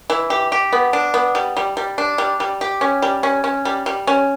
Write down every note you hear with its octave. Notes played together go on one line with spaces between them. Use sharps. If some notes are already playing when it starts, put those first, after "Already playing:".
E3
G4
G4
B3
D4
B3
G3
G3
G3
D4
G3
G3
G4
C#4
G3
C#4
C#4
G3
G3
C#4